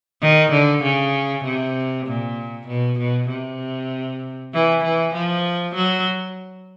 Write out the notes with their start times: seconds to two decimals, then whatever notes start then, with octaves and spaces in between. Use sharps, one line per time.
0.22 D#3
0.52 D3
0.83 C#3
1.44 C3
2.06 A#2
2.68 B2
2.99 B2
3.29 C3
4.53 E3
4.84 E3
5.14 F3
5.75 F#3